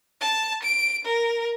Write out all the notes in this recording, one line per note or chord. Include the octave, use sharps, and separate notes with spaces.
A5
D7
A#4